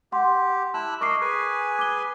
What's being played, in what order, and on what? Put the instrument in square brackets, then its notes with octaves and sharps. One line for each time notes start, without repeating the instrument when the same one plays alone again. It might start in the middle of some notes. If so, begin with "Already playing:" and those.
[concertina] G4 [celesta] F#5 C6
[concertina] E4 E6 F#6 [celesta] A5
[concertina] A#4 D#5 [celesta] C#6 D6 C7
[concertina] G#4 B4 G#5
[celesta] D6 G7